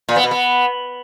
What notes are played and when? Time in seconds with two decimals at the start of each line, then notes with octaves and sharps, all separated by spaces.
0.09 A#2
0.16 B3
0.24 B2
0.31 B3